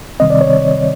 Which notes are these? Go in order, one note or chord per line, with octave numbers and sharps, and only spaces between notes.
C2 C3 D#3 G3 C4 D#5
D5
C#5